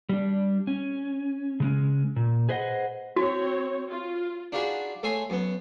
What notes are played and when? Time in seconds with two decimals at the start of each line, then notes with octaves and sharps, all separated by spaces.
0.09 G3 D4
0.67 C#4
1.60 C#3 G#3 C#4
2.16 A#2
2.49 G#4 B4 C5 D#5 E5 F#5
3.16 C4 F#4 C#5
3.90 F4
4.52 D4 D#4 F4 F#4 G#4 B5
5.03 A3 A4 C#5 G#5 C6 D#6
5.30 F#2 B3